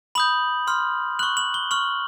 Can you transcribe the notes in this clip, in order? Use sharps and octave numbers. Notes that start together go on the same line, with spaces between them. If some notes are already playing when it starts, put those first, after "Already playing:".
B5 D#6 G6 F#7
C6 F6
C#6 F#6 F#7
F#7
G7
C#6 F6 F#7